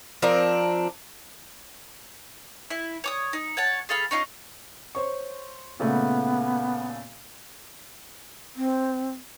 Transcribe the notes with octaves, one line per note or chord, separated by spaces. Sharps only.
F3 C4 D4 A#4
E4
C#5 D6 D#6
D#4
C#5 F#5 A5
G#4 A4 F5 B5
C#4 D#4 F4
C5 C#5 C#6
A#2 C#3 A3 B3
C4